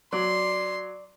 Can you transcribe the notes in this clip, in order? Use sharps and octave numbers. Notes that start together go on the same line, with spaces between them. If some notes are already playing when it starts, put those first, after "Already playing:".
F#3 D5 C6